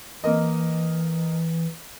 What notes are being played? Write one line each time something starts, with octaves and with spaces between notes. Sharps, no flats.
E3 A#3 A#4 D#5